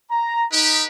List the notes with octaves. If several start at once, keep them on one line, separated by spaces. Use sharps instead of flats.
A#5
D#4 G4 B4